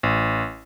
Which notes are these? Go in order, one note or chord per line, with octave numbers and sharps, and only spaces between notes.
A1